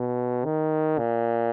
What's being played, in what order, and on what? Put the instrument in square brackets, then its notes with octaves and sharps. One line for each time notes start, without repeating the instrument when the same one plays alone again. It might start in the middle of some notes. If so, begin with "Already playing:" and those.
Already playing: [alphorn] B2
D#3
A#2